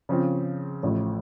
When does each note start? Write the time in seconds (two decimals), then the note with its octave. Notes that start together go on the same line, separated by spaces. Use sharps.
0.09 C#3 F3 C4
0.83 A1 A2 F3 A3